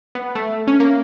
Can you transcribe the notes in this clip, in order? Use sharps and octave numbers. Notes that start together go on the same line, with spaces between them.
B3
A3
C#4
A#3